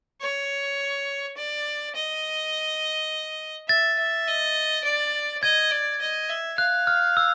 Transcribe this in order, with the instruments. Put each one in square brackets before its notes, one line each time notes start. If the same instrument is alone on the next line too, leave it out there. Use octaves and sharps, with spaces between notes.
[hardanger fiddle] C#5
D5
D#5
[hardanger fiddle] E5 [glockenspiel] A6
[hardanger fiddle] E5
D#5
D5
[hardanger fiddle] D#5 [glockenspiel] G#6
[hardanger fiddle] D5
D#5
E5
[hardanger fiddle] F5 [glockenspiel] F#6
[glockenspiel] F6
E6